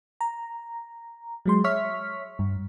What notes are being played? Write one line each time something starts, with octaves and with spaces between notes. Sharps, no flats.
A#5
F#3 G#3 C6
C#5 E5 C#6 F6 B6
G2